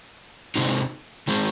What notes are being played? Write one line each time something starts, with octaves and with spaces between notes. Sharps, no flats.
C3 D#3 G#3 C4 D#4
D#3 G#3 C4